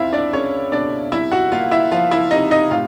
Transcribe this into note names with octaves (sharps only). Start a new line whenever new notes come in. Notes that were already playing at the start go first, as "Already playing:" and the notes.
Already playing: C#2 C4 E4 F4 E5 F5
D4 D5
G#3 C#4 C#5
B2 D4 D5
C2 E4 E5
F#4 F#5
A#3 F4 F5
E4 E5
F3 F4 F5
E4 E5
C3 D#4 D#5
D#4 D#5
A2 F4 F5